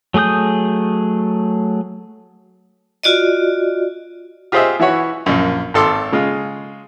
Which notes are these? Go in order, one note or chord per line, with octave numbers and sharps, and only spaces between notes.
F#3 A3 G#4 D#6 G6
F4 F#4 D5 D#5
F4 G4 G#4 C5 D#5 E5
E3 E4 F#4 C#5
A#1 F#2
G#1 A4 C6 D6 E6
C#3 G#3 F4